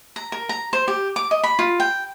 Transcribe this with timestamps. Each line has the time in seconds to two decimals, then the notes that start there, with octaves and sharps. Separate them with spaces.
0.16 A#5
0.32 A#4
0.49 A#5
0.73 C5
0.88 G4
1.16 D6
1.31 D#5
1.44 B5
1.59 F4
1.80 G5